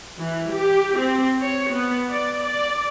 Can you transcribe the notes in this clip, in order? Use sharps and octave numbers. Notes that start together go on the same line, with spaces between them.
E3
G4
C4
C#5
B3
D5
D5